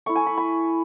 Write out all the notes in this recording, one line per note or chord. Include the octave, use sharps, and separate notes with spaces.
A3 E4 C#6
G#5
B5
B5